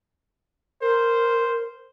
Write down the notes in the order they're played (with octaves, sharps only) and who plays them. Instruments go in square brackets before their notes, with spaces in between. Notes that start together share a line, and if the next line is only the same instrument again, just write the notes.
[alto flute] A#4 [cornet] C5